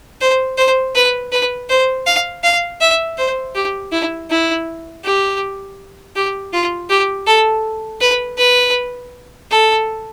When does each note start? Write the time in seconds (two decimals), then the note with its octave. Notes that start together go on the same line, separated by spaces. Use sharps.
0.21 C5
0.58 C5
0.95 B4
1.32 B4
1.69 C5
2.06 F5
2.44 F5
2.81 E5
3.18 C5
3.55 G4
3.92 E4
4.30 E4
5.04 G4
6.16 G4
6.53 F4
6.90 G4
7.27 A4
8.01 B4
8.38 B4
9.51 A4